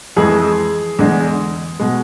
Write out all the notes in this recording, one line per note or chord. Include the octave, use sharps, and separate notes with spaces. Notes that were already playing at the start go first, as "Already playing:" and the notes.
F2 E3 G#3 G#4
E2 D3 G#3
B2 G#3